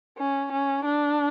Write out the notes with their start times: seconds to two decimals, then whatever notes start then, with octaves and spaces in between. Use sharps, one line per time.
0.18 C#4
0.52 C#4
0.85 D4